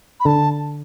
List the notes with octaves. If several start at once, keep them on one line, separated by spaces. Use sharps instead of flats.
B5
D3 A5